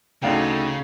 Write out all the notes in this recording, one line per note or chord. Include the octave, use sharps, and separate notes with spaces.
D2 C#3 D#4 A4 F5 G5